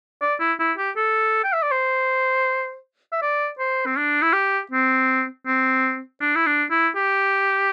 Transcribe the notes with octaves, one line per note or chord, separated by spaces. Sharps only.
D5
E4
E4
G4
A4
G5
E5
D5
C5
E5
D5
C5
C4
D4
E4
G4
C4
C4
D4
E4
D4
E4
G4